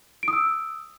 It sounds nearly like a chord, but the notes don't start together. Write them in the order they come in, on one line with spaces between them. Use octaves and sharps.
D7 D#6 E6